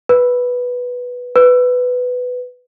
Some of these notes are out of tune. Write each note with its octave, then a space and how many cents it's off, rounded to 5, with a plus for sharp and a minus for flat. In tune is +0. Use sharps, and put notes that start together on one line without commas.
B4 -5
B4 +10